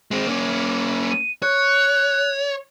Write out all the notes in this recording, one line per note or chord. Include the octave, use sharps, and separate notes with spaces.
G#3 C4
A#3 C#4
D#7
C#5 F#6